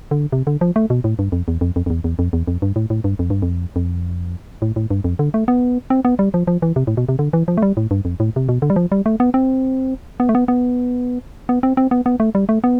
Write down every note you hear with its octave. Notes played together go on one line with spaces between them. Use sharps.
D3
C3
D3
F3
A3
B2
A2
G2
F2
E2
F2
F2
F2
E2
E2
F2
E2
F2
G2
A2
A2
G2
F2
G2
F2
F2
A2
A2
G2
F2
D3
A3
B3
C4
B3
G3
F3
F3
E3
C3
A2
B2
C3
D3
E3
F3
A3
G3
A2
G2
F2
A2
C3
B2
D3
G3
F3
G3
A3
B3
C4
B3
A3
B3
B3
B3
C4
C4
B3
B3
A3
G3
A3
B3